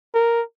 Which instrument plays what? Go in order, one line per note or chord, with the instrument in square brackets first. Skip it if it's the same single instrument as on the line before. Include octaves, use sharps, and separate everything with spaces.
[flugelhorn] A#4